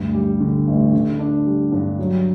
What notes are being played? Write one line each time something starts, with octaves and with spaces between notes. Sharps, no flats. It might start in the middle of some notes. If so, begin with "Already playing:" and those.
Already playing: D2 G2
G3
D3
A1
D3
D4
G3
G2
F#3